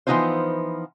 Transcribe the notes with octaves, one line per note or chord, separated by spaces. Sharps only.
E3 F3 B3 D#4 F4 C5